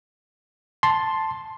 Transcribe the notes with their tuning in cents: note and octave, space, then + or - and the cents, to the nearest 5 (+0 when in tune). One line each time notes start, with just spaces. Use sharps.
A5 +0 C6 +5